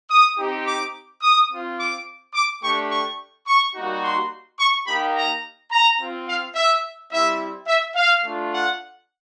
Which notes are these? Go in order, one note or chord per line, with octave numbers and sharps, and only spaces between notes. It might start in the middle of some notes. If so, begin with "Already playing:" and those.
D#6
C4 D#4 G4
D6
D#6
C4 F4
D6
D6
A3 D4 G4 C#6
C#6
C#6
G3 A#3 D#4 F#4
C6
C#6
A#3 D#4 G4 B5
A#5
A#5
C4 F4
F5
E5
G3 C4 E4 E5
E5
F5
A3 D4 F4
F#5